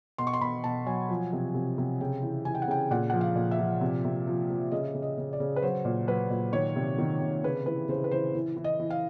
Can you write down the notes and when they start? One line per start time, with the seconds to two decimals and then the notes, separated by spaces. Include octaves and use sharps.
0.18 B2 C6
0.27 C#6
0.34 C6
0.41 B2 B5
0.64 B2 A5
0.86 F#3 G#5
1.09 F3
1.33 C3
1.54 C3
1.78 C3
2.01 C#3 G5
2.22 E3
2.45 E3 G#5
2.55 G5
2.62 F#5
2.68 C#3 G5
2.91 A#2 F#5
3.10 F3 F#5
3.21 F5
3.35 A#2
3.51 E5
3.59 F3
3.81 C3
4.05 C3
4.27 F3
4.50 F3
4.72 C#3 D#5
4.94 C#3
5.02 D#5
5.18 C#3
5.33 D5
5.40 C#3
5.56 B4
5.62 F#3 C5
5.85 A#2
6.08 F#3 B4
6.30 A#2
6.53 D#3 C#5
6.76 C3
6.98 D#3
7.22 C3
7.44 C#3 B4
7.66 E3 B4
7.88 C#3 C5
8.04 B4
8.11 E3 C5
8.35 E3
8.56 E3
8.64 D#5
8.79 E3
8.90 F5